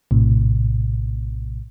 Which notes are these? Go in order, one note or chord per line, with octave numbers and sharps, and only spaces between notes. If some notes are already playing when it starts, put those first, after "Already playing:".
A#1 A2 C3